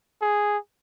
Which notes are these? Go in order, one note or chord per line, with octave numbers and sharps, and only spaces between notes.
G#4